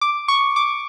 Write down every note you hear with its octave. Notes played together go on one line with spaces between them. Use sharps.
D6
C#6
D6